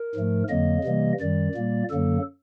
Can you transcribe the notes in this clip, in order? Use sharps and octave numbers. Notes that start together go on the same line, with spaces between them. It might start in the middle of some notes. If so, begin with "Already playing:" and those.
Already playing: A#4
G#2 F3 A3
F2 D3 F#3 A#3 D#5
C3 E3 G3 A#3
F#2 D#3 G3 D5
A#2 G3 A#3
F#2 D3 F#3 A#3 A4